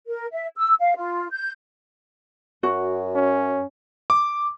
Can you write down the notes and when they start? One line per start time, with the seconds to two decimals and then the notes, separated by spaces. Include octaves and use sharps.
0.07 A#4
0.33 E5
0.56 E6
0.80 F5
0.97 F4
1.32 G6
2.63 F#2 F#4
3.15 C#4
4.10 D6